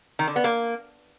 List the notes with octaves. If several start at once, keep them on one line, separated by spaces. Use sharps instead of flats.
D#3
D3
B3
A#3